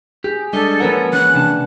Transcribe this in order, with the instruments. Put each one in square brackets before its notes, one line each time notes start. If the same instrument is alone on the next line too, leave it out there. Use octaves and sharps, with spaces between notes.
[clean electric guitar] G4 [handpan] G#4
[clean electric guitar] G3 D4 D#5 [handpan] G#3 [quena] A4
[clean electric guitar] F3 C#4 A#4 [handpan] A#3 B4 F#5
[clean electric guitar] E3 [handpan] A#3 C#4 [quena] F#6
[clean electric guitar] C3 A5 [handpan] D4